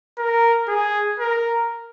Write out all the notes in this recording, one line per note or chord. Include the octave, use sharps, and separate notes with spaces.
A#4
G#4
A#4